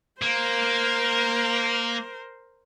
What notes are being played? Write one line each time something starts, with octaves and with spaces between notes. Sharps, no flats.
A#3 A#4 C5